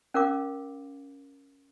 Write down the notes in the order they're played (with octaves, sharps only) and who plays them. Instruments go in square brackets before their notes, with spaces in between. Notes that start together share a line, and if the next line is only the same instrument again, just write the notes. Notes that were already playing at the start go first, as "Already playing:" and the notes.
[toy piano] C#4 A#4 F5 D6